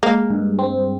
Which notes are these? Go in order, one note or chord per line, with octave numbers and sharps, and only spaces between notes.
G#3 A#3
G2
C4